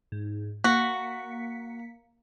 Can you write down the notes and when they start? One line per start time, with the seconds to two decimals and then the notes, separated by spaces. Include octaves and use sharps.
0.12 G#2
0.64 A#3 F#4 B6 C#7